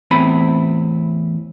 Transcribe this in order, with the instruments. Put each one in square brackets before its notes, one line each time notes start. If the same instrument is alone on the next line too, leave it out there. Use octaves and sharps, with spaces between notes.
[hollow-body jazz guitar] E2 A2 C4 E4 G#5 B5